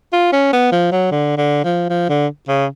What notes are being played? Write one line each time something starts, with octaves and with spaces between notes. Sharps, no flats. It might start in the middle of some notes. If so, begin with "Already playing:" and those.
F4
C#4
B3
F3
F#3
D3
D3
F3
F3
D3
C#3